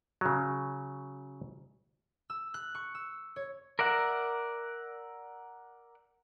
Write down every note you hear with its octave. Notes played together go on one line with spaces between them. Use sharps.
C#3 F#3
E6
F#6
C#6
E6
C#5
A#4 D5 E5 F#5